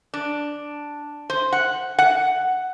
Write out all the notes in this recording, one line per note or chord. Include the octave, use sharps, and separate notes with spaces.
D4
C5
F#5
F#5